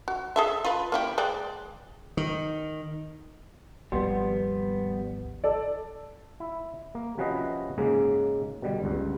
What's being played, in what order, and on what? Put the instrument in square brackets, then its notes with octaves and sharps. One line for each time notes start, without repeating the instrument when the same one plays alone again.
[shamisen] F#4
G#4 A4 E5
F4 B4
A#3 E4 G4
G#3 D5 G5
[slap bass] D#3
[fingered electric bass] G#1 D#2 F3 [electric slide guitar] G3 B3 [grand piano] C6
[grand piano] A4 D5
[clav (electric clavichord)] E4
A#3
C3 F3 C#4 F#4 B4 D#5
G#2 C#3 G#3 A#3
B2 D3 G3
G1 C#2 G2